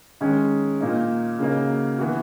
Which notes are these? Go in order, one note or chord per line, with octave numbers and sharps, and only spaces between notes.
D#3 G#3 C#4
A#2 A#3 D#4
C#3 F#3 A#3 D#4
E3 B3 F#4